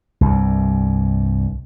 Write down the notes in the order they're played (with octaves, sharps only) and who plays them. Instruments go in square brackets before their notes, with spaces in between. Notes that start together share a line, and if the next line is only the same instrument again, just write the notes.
[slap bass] C2 G2